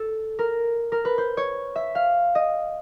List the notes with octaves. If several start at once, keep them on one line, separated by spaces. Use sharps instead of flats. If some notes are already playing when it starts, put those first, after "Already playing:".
Already playing: A4
A#4
A#4
B4
C5
C#5
E5
F5
D#5